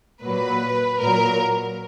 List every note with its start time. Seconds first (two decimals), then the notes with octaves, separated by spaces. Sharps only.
0.21 A#2 F#3 B4
1.00 A#2 F#3 A#4